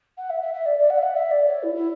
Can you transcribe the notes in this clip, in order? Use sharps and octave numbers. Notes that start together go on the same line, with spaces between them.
F#5
E5
E5
E5
D5
D5
F#5
E5
F#5
E5
D5
C#5
E4
E4